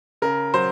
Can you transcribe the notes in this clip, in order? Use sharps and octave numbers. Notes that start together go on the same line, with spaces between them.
C#3 A#4
F#3 C5